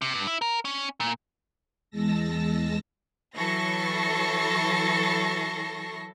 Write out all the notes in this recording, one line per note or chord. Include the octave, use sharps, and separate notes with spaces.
C3
G2
E4
A#4
C#4
A#2
E2 G#3 A5 E6 A#6
E3 F#3 A4 C#6 A#6 C7